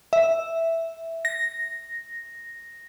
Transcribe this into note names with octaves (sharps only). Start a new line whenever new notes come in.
E5
A#6